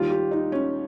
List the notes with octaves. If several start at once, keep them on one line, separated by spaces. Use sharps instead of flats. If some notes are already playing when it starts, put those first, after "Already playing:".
Already playing: D#2 D#3 G3 F4
G4
D#4
C#4